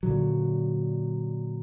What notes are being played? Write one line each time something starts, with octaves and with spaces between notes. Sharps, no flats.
A#2 D3 F#3